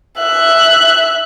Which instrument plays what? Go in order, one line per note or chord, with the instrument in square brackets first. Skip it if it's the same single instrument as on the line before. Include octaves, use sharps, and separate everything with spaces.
[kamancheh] E5 F#6